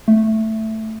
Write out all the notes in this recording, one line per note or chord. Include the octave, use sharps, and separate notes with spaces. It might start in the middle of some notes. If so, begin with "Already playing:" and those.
A3